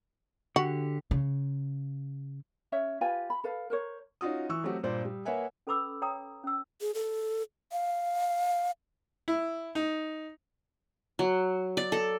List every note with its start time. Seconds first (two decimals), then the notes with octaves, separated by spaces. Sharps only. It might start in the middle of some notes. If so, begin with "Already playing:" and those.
0.56 D3 F#4 G4
1.11 C#3
2.72 C#4 C#5 E5
3.01 F4 G4 B4 G#5
3.30 B5
3.44 A4 B4 F5
3.70 A#4 C5 C#5
4.21 C#4 D#4 F4 F#4 D#6
4.49 E3 C#6 E6
4.64 F#3 A3 C4 F#4 G4
4.83 G2 A#2 C5 D5
5.05 G3
5.25 A#3 B4 C#5 E5 F#5 G#5
5.67 C#4 A4 B4 B5 D6 E6
6.02 C#5 G5 A#5 D#6
6.44 C#4 E6
6.81 G#4
6.95 A4
7.72 F5
9.28 E4
9.75 D#4
11.19 F#3
11.77 D5
11.92 A4